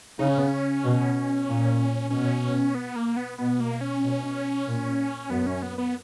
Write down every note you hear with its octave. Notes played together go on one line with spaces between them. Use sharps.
C#3 D#4
C#4
B3
C#4
B2
A#2
B2 C#4
B3
A#3
B3
B2 B3
A#3
C#4
B2
A#2
F#2 B3
C#4
B3
B3